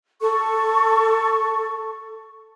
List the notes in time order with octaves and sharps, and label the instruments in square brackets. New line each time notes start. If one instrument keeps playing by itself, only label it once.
[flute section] A4 C#6